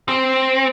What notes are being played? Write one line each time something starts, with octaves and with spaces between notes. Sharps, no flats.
C4